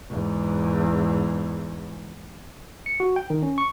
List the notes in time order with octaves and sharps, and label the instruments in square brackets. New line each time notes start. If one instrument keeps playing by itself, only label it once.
[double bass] E2 G#2
[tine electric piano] C#7
F#4
G5
D#3
C#4
C#6